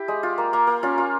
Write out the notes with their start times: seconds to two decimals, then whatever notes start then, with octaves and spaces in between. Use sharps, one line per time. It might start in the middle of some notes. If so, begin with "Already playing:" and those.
Already playing: E4 G4
0.08 G#3
0.23 F4
0.38 A#3
0.53 A#3
0.67 A#3
0.83 C#4 F4
0.98 F4